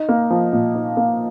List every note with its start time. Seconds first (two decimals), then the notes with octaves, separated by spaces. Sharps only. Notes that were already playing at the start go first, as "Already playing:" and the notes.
Already playing: D#4
0.09 A#3
0.30 F3
0.53 A#2
0.75 D#4
0.97 A#3